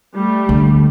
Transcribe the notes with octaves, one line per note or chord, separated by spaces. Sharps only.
G3 A3
D2